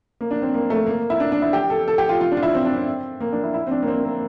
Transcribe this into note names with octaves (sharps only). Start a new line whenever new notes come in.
A#3
D4
C4
A#3
A3
A#3
E4
D4
D4
E4
G4
A4
A4
G4
F4
F4
D4
F4
E4
C4
D4
C4
A#3
D4
E4
E4
C4
D4
A#3
C4
A#3